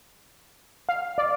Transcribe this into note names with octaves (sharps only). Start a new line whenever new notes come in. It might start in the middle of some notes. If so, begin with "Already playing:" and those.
F5
D5